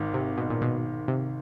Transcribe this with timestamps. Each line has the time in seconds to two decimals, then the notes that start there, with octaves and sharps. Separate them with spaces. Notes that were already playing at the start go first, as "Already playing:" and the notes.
Already playing: G#1 G#2 D#3
0.14 C3
0.37 B2
0.50 A#2
0.61 B2
1.08 C3